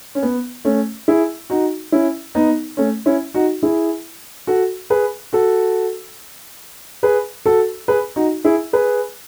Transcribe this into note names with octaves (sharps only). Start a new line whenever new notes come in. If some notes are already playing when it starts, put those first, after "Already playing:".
C#4
B3
A3 C#4
E4 G#4
D#4 F#4
C#4 E4
B3 D#4
A3 C#4
C#4 E4
D#4 F#4
E4 G#4
F#4 A4
G#4 B4
F#4 A4
G#4 B4
F#4 A4
G#4 B4
D#4 F#4
E4 G#4
G#4 B4